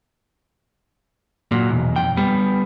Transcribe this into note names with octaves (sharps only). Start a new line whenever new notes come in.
A#2 F#3
B1 E2
F2 G5
G3 B3